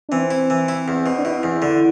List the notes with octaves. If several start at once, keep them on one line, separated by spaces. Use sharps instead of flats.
D4
E3 C4
E4
E3
E4
E2
B2
D4
B2 E4
E2
D3